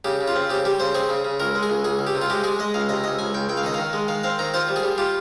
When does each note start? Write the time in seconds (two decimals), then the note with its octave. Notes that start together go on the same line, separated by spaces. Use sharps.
0.05 C#3 G4
0.21 C#3
0.28 F4
0.36 C4
0.50 C#3 G4
0.65 G3 G4
0.80 C#3 C5
0.95 C4 G#4
1.09 C#3
1.25 C#3
1.40 C#2 A#4
1.55 G#3
1.63 G#4
1.70 C#2
1.84 C#2 G#4
1.99 C#2
2.07 G4
2.15 C3
2.22 F4
2.30 G#3 G4
2.44 G#3 G#4
2.59 G#3 D#5
2.74 C#2 F5
2.89 C3 D#5
3.04 C#2 D#5
3.19 C#2 G#5
3.34 C#2 G5
3.49 C#2 G5
3.57 F5
3.63 D#3 D#5
3.74 D#3 F5
3.93 G#3
4.08 D#3 F5
4.24 C4 F5
4.39 D#3 A#5
4.54 F4 C5
4.69 G3
4.76 G#4
4.83 G3
4.98 F4 G4